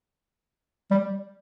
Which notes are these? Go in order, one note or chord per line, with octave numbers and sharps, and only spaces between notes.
G3